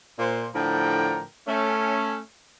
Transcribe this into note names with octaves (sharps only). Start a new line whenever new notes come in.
A#2 C5
A2 D3 F3 A#4 G5 A#5
A3 C#4